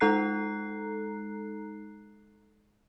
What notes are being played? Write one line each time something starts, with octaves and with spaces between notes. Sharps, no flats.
G#3 D#4 A4 A#5 F#6 C7